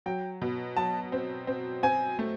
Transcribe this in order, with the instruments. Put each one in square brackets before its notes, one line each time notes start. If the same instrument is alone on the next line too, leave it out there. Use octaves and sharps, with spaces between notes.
[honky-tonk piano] F#3 [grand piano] G5
[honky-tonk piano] B2
[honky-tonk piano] F#3 [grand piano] A5
[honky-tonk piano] C4
C4
[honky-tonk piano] C4 [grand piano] G#5
[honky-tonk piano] A3